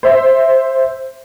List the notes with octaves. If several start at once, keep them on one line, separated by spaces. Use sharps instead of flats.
C5 E5